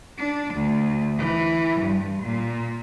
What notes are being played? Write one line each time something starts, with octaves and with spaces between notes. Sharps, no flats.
D4
D2
E3
G2
A#2